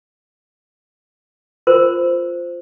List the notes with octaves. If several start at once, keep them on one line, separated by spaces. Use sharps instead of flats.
F4 A#4 C5